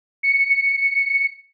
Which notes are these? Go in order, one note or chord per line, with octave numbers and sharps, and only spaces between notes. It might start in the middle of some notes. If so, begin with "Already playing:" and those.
C#7